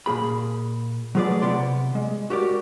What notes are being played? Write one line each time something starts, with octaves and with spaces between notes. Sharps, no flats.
A#2 A#3 G#4 B5
F#3 A3 F4 G#4 B4 D5
C3 B3 D5 C6
G#3
F#4 G4 A#4 D5